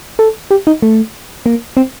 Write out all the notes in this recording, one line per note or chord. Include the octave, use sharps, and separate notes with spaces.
A4
G4
D#4
A3
A#3
C4